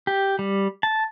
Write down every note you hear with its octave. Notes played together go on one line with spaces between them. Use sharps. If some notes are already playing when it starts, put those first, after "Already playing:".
G4
G3
A5